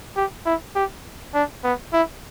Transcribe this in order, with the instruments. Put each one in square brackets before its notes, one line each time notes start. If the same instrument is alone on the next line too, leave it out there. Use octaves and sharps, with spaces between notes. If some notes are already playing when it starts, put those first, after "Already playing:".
[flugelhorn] G4
E4
G4
D4
B3
E4